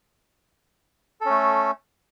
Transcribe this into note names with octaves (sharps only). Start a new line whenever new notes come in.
A3 C#4 A4